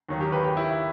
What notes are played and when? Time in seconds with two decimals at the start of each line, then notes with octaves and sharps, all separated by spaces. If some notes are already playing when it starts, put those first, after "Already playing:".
0.09 D#2 D#3 F#3
0.21 G4
0.32 B4
0.44 G4
0.57 E4